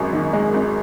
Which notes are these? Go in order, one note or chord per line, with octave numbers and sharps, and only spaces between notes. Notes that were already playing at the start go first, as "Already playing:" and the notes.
Already playing: G#1 F#2 G#3
D#3
G#3
G#1